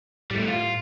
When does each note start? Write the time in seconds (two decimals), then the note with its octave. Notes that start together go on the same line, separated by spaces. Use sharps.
0.31 A2 G3 A3
0.48 F4